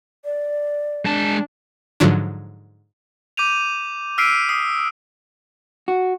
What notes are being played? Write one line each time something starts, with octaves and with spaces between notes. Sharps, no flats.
D5
G#3 D4 A5
G#2 D3 F3 F#3 D4
D6 G6 D#7 F7
E6 F6 B6 C7 D7 D#7
D#6 C7
F#4